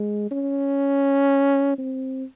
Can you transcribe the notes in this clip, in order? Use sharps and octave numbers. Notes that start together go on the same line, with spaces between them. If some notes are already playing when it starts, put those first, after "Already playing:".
Already playing: G#3
C#4
C4